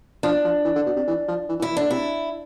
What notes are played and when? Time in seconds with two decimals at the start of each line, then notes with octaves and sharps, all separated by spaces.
0.23 F3 D4
0.45 F3
0.65 E3
0.76 D3
0.86 B2
0.96 C3
1.07 E3
1.28 F3
1.49 E3
1.59 E3
1.62 E4
1.70 E3
1.77 D3 D4
1.91 C3 E4